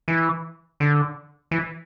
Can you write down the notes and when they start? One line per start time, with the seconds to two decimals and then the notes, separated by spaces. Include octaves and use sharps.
0.08 E3
0.80 D3
1.51 E3